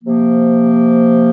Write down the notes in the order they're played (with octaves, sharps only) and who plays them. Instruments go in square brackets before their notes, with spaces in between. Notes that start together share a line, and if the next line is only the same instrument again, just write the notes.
[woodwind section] C3 F3 A#3